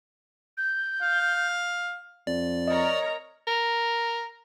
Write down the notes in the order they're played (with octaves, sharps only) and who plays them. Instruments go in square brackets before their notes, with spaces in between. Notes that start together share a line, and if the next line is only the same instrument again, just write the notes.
[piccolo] G6
[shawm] F5
[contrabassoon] F2 [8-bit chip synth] D5
[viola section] A#4 C#5 A#5 [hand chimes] D#5
[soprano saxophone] A#4